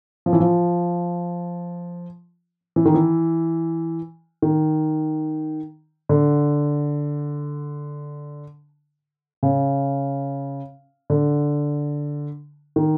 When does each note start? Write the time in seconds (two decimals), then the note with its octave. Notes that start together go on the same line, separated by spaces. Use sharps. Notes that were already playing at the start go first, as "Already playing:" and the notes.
0.26 F3
0.33 E3
0.40 F3
2.76 E3
2.85 D#3
2.94 E3
4.42 D#3
6.09 D3
9.43 C#3
11.10 D3
12.76 D#3